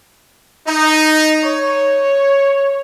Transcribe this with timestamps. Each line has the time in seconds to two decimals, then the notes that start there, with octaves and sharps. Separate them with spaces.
0.67 D#4
1.44 C#5